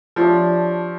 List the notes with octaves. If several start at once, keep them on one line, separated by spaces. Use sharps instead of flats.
F3 D4 G4 C#5 E5